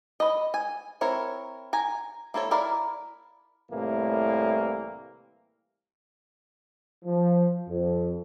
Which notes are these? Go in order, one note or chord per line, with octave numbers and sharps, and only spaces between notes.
B4 D#5
G#5
C4 E4 A#4 C#5
G#5 A#5
A#3 E4 A4 C#5
E4 A#4 D5 F5
C2 A2 E3 A#3
F3
F2